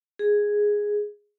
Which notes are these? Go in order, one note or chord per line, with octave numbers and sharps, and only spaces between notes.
G#4